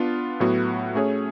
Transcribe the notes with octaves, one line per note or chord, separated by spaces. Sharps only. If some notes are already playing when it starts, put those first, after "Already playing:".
Already playing: B3 D4 F4
A2 F#3 B3 F#4
A3 C#4 G#4 C#5